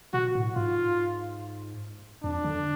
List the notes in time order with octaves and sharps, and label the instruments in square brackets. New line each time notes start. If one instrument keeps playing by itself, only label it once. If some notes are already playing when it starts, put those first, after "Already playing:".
[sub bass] B2 [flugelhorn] F#4
[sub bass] A2
[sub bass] G#2 [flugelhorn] F4
[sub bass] F2 [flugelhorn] D4
[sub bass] D3